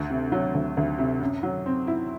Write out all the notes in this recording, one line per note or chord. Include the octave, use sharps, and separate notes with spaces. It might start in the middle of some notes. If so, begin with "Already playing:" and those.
Already playing: D2
C3
F#3
D2
D2
C3
F#2
F#3
C4
E4